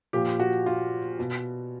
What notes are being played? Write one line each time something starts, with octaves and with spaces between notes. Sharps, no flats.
A#2 F3 G4
F#4
F4
B2